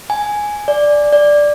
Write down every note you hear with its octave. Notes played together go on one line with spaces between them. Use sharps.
G#5
D5
D5